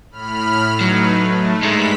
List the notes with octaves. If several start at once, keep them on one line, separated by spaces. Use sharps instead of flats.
A2 B5 F6
F#3 A3 D#4 B4
A3
G2 G#3 D#4 B5 B6